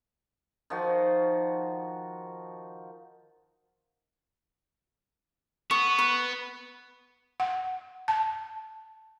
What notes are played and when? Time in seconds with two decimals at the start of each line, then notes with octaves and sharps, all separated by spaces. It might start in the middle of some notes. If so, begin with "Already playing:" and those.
0.70 D#3 F3 F#4
5.71 B3 C#6
5.99 B4
7.40 F#5
8.08 A5